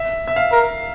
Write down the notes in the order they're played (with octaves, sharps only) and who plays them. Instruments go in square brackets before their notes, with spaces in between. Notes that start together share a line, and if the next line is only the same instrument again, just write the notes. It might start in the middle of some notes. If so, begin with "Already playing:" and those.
Already playing: [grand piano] E5
E5
F5
[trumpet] A#4